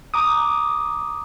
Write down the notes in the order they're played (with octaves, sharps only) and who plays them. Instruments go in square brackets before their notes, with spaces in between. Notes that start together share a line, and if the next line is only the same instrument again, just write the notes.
[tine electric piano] A#5 D6 D#6